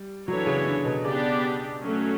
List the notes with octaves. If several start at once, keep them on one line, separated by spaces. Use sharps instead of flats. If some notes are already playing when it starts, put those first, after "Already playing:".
Already playing: G3
E3 F#3 B3 D4 A4 C#5
C#3
D3
B2
C#3 B3 D4 G4 D5
F#3 A3 C#4